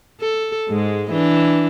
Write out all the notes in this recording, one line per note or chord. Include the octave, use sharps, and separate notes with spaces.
A4
G#2 G#3
E3 D4